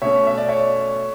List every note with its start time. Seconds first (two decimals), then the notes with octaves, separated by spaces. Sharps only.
0.02 B2 A3 C#4 C#5 E5
0.27 E5
0.38 D5
0.49 C#5 E5